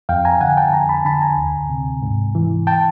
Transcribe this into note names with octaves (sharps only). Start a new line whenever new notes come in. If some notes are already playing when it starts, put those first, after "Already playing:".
F2 F5 G5
G#5 A#5
D3 F#5 G#5
G5 A5
F2 G#5 A#5
A5 B5
D3 A5 B5
G#5 A#5
D2
C3
G#2
E3
G5 A5